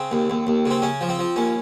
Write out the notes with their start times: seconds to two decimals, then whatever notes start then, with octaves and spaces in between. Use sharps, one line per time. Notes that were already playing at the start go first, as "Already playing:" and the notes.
Already playing: C#3 C4
0.12 D#2
0.30 D#2
0.47 D#2
0.65 C#3 C4
0.82 C#3 C#4
1.01 F3
1.09 C4
1.19 F3
1.36 D#2 C#4